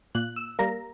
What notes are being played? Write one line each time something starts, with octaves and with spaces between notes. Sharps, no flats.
A#2 F#6
E6
G3 A#3 A#5